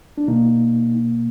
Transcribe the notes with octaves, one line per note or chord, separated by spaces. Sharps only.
D4
B2 A#3 D#4